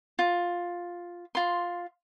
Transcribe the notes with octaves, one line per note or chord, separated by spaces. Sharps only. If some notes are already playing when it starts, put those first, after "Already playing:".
F4
F4 C6